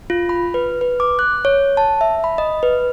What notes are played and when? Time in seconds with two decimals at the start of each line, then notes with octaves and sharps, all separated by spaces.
0.10 F4
0.29 B5
0.54 B4
0.81 B4
1.00 D6
1.19 F#6
1.45 C#5
1.77 A5
2.01 E5
2.24 B5
2.38 D#5
2.63 B4